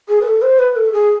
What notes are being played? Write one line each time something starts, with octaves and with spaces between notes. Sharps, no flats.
G#4
B4
A4
C5
B4
A4
G#4